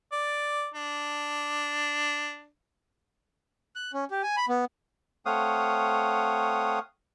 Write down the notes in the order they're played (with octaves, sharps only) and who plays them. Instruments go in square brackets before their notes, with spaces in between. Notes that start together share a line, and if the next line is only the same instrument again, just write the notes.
[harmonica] D5
D4
[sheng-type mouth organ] F#6
C#4
G4
G#5
B5
B3
[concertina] A3 C4 C#5 F5 F#5 D#6